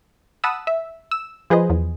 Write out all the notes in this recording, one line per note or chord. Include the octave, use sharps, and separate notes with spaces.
F#5 A5 B5 D#6 E6
E5
E6
F3 G#4 B4 C5 D#5
E2